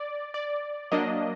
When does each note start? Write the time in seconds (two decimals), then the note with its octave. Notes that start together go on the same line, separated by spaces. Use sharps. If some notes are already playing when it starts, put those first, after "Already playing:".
Already playing: D5
0.34 D5
0.92 F#3 A#3 D4 D#5